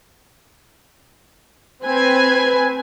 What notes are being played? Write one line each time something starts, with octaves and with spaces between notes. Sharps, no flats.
C4 B4 G#5